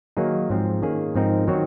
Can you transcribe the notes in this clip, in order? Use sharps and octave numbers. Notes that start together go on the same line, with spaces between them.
D#3 F#3 A#3 D#4 G#4
G#2 F3 C4
D#3 A#3 C#4 G#4
G#2 F3 C4 D#4 A#4
D#3 F#3 C4 F#4 C#5